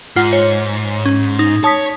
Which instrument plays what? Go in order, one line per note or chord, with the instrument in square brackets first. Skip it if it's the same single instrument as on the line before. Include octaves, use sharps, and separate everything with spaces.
[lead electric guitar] G#2 [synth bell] F4 F#5
[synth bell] C#5
C#4
D#4
[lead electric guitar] C#5 [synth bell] A5 D#6 B6